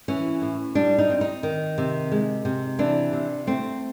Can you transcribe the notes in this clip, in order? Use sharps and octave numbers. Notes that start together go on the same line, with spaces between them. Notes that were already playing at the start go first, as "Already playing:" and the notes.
E3 C#4
A2
G3 D4
D#4
C4
D#4
D#3
C3
G#3
C3
E3 D4
C3
A3 C4